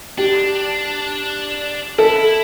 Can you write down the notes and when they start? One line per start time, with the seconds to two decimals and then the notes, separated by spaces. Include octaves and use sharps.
0.18 D4 G4
1.98 E4 A4